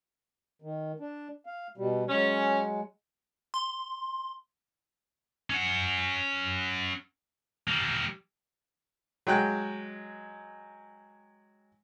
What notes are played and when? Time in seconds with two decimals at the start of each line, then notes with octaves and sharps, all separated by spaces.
0.62 D#3
1.00 D4
1.46 F5
1.78 B2 G3
2.09 F#3 G#3 C#4
3.54 C6
5.50 C#4 F#5
7.68 G3 A#3
9.27 F#3 G#3 G5 F#6